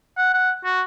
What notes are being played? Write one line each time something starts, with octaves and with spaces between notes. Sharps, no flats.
F#5
F#5
F#4